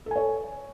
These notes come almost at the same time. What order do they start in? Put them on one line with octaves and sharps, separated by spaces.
A4 G#5 C#5